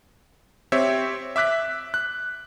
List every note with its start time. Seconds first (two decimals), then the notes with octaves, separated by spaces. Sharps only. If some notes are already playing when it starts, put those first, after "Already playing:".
0.72 C4 G4 C#5 E5
1.36 E5 D6 F#6 B6
1.94 F#6